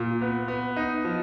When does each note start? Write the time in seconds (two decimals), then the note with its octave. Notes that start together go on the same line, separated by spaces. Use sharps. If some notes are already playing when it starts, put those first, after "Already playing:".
Already playing: A#2
0.21 B3
0.48 B3
0.76 D#4
1.04 F3